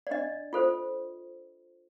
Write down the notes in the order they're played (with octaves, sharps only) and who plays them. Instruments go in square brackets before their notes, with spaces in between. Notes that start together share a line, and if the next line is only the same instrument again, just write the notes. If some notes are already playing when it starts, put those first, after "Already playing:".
[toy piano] D5
D4 D#5
F4 A4 C5